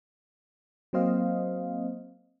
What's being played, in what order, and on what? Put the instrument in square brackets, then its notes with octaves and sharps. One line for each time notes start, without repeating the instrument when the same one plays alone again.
[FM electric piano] F#3 A#3 C4 C5 D#5 F5